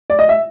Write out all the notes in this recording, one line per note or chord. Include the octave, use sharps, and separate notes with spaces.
D5
D#5
E5